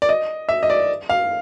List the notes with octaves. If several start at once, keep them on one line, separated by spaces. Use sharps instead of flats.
D5
D#5
E5
D#5
D5
F5